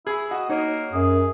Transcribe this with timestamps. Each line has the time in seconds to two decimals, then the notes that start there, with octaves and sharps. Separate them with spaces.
0.07 E4 G#4
0.31 F#4 D#5
0.50 A#3 D#4 C#5 D#5
0.93 F#2 G#4